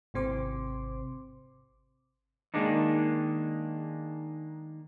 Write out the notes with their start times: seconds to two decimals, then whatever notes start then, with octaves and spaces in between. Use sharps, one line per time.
0.14 G#1 C3 C4 C6 D6
2.54 D#3 G#3 A#3 D4 D#4